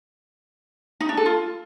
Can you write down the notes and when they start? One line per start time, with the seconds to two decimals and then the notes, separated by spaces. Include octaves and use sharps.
1.00 D#4
1.09 D4
1.17 A4
1.26 F4